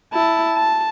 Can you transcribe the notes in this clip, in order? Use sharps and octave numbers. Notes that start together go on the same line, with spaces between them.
E4 A5
A5